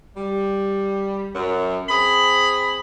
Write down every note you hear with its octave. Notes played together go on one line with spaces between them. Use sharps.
G3
F#2
C4 G#4 B5